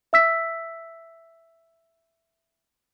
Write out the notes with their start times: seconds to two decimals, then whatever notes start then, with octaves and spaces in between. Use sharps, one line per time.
0.13 E5 E6 B6